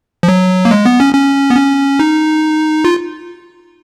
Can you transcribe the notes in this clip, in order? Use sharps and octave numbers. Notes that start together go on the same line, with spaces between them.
F3
F#3
A#3
G#3
B3
C#4
C#4
B3
C#4
D#4
F4